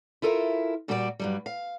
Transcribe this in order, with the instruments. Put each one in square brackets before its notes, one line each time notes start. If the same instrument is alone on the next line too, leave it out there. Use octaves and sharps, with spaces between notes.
[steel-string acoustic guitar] E4 F4 A4 A#4 E5
A#2 G3 F#4 G4 A4 D5
G2 F#3 G3
F5